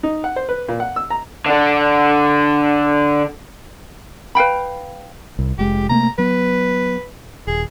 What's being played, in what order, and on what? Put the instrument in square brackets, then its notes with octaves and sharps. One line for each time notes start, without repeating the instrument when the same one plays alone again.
[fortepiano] D#4
F#5
C5
B4
A#2
F#5
E6
A#5
[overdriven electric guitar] D3 D4
[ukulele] B4 F5 G5 B5
[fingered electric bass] C2
[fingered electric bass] F1 G#3 [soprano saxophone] G4
[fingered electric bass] C3 A3 A#3 [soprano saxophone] A#5
[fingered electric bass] F#3 B3 [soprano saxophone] B4
[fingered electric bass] D#1 [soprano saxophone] G#4